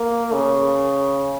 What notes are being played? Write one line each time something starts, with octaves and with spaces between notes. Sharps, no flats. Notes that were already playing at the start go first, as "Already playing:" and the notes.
Already playing: A#3
C#3